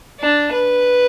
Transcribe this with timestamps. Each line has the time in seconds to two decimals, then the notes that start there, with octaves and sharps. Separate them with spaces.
0.20 D4
0.52 B4